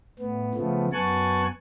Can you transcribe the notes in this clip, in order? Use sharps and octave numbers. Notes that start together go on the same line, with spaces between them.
A2 B3
C#3 F3 A3 B3
F#2 B3 G#5 A5 C#6 F#6